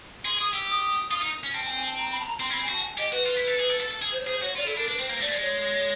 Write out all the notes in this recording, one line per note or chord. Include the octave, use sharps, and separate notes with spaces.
G#4 C6
G#4 D#6
G4 E6
E6
D#6
F4
D#4
C#4
C4 A5
G#5
G#5
A5
A#5
B5
A5
A#5
C4 C6
C#4 B5
C4
G#5
F#4 A5
G#5
G4 D#5
F#4 B4
F4
E4
A4
G#4
A4
A4
A4
G#4
C5
C#5
G#4 C5
F#4 C#5
F4 D5
E4 A4
D4 A#4
D4 B4
C4 C5
A#3
A3 D5
G#3
C#5